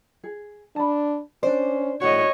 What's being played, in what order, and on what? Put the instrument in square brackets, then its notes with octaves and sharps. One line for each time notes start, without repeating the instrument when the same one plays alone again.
[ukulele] G#4
[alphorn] D4 [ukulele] A5 B5
[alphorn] C#4 [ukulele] D4 D5 [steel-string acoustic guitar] C5
[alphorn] A2 [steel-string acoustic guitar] F#4 [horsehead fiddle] C#5 D#5